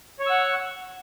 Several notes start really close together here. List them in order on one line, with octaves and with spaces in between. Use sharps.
C#5 C#6 E6 F#5